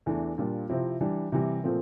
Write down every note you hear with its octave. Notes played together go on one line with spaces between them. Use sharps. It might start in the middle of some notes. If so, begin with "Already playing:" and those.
E2 E3 A3 D4
A#2 G3 D4 F4
C3 F3 C4 E4
E3 G3 D4
C3 E3 G3
A#2 F3 A3 C4